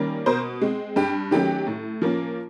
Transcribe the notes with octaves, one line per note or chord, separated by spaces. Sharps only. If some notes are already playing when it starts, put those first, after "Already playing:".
Already playing: D#3 G3 A#3 C#4
B2 A#4 C5
G#3 C4
G2 G4
D#3 F#3 A3 C#4 G4
A2
F3 A#3 C#4